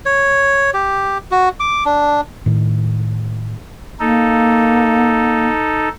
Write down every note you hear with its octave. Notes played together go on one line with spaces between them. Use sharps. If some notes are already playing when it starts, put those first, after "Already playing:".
C#5
G4
F#4
D6
D4
A2 D#3
A#3 D#4 A4